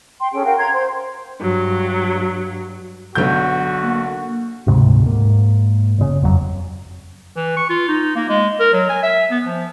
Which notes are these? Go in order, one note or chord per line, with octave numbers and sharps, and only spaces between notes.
G5 C6
C#4 G#4 A4 G5
F#4 A#4 F5 G5
A#5 C6 G#6
C5 C6
G2 F#3
B1 D3 F#4 G6
A#3
D2 G#2 C3
G#2 A#3
G1 C#3
F#1 F2 F#3
E3
C#6
F4
D#4
A#3
G#3
A#4
F#3
G#5
E5
B3
F3